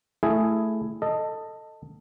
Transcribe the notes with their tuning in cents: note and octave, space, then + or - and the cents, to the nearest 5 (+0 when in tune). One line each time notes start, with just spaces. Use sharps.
A3 +0 E4 +10 G#4 +0
A4 +15 D#5 +0